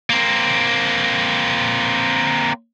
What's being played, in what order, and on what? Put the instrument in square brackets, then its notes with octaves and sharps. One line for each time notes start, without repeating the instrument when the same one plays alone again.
[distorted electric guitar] A#3 C4